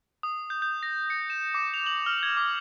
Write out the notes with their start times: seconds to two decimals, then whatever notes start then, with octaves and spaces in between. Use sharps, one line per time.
0.23 D#6
0.50 G6
0.62 G6
0.83 A#6
1.10 C#7
1.30 E7
1.54 D6
1.74 F7
1.86 F#7
2.06 F6
2.23 G#6
2.37 D6